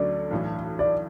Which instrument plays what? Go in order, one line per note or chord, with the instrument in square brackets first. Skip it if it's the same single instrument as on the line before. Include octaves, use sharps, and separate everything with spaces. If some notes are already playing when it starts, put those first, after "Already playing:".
Already playing: [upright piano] D2 D3 F#3 A3 C#4 [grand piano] D5
[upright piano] B1 A2 E3
[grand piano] D5